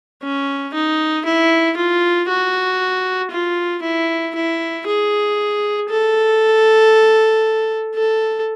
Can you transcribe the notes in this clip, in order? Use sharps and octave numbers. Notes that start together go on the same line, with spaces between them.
C#4
D#4
E4
F4
F#4
F4
E4
E4
G#4
A4
A4